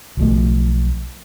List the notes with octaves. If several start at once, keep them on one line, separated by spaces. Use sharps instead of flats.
B1 F3 A3